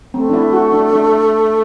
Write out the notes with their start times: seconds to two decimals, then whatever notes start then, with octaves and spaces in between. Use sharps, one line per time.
0.14 A3 C4
0.29 D4
0.33 E4
0.53 F#4
0.73 D4
0.93 D4